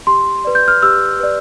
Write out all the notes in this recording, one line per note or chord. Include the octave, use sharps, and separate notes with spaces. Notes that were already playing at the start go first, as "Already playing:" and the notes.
G4 C6
B4 D5
G6
F6
G4 E6
B4 D5